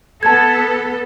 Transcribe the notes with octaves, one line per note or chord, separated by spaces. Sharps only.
B3 A4 A5 G#6